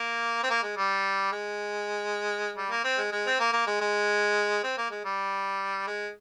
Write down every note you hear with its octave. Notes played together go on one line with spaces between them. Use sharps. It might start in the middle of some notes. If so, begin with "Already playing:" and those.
Already playing: A#3
C4
A#3
G#3
G3
G#3
G3
A#3
C4
G#3
G#3
C4
A#3
A#3
G#3
G#3
C4
A#3
G#3
G3
G#3